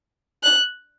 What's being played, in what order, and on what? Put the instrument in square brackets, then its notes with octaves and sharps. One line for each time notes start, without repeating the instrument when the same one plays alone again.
[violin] F#6